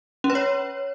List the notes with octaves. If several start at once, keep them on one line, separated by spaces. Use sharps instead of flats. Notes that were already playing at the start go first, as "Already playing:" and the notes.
C#4
B4
C#5